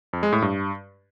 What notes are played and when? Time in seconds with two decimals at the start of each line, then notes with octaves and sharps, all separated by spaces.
0.13 F2
0.23 G#3
0.33 A2
0.42 G2